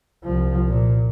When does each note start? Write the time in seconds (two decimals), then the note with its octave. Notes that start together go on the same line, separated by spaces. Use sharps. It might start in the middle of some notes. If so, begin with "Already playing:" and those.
0.24 C2 F3
0.68 A#2